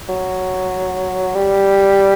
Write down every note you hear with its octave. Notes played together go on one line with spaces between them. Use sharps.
F#3
G3